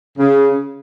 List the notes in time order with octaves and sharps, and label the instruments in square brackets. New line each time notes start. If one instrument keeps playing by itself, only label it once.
[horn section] C#3